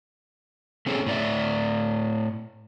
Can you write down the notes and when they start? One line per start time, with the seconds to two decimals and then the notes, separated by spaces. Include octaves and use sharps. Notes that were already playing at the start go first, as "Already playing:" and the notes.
0.86 A3 C4 C#4 G#4 A4
1.06 A2 D5 E5